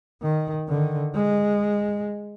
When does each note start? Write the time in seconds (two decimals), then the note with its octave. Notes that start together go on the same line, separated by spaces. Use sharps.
0.22 D#3
0.68 D3 D#3
1.15 G#3